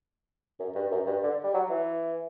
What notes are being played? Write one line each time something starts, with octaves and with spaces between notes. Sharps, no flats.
F#2
G2
F#2
G2
D3
G3
F#3
E3